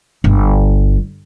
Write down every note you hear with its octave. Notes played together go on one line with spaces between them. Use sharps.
G1